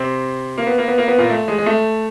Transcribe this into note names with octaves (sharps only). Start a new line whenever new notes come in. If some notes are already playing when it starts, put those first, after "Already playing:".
Already playing: C3 C4
A#3
B3
A#3
B3
A#3
B3
A#2 A#3
A3
G#3
G#3
A3